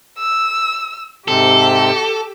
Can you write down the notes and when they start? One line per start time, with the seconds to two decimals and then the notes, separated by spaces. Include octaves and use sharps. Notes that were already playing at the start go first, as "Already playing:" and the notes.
0.18 E6
1.28 G#2 C3 C4 G4 A4